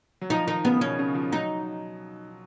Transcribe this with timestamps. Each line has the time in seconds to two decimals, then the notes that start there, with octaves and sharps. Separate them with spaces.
0.21 F#3
0.30 F3 D#4
0.47 D#3 D#4
0.65 C#3 B3
0.81 B2 C#4
0.99 C#3
1.15 F3
1.32 F#3 D#4